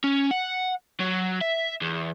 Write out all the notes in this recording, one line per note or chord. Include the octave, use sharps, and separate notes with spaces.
C#4
F#5
F#3
E5
E2